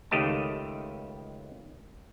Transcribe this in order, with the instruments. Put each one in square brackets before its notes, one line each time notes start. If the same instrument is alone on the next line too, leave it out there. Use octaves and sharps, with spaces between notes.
[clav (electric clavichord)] C#2 D#3 A3 G4 D#5 A5